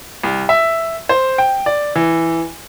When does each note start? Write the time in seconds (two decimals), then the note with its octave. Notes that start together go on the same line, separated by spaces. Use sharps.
0.24 C2
0.49 E5
1.09 C5
1.38 G5
1.66 D5
1.96 E3